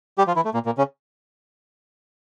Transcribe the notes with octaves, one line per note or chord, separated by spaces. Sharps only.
G3 G4
F3 F4
E3 E4
A3
A#2 A#3
A#2 A#3
C#3 C#4